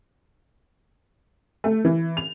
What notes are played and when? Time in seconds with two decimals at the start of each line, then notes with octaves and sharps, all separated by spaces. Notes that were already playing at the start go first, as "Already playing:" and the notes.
1.64 A3
1.85 E3
2.17 F7